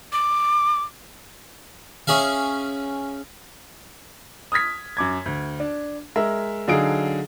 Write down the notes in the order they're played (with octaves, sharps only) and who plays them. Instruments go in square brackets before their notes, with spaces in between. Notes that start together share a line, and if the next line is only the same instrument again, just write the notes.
[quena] D6
[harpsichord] C#4 G#4 E5 F5
[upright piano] D#6 F6 G#6 B6
F#2 D6 G#6
D2
D4
G#3 A#4 E5
D3 F#3 D#4 G#4 F5 D7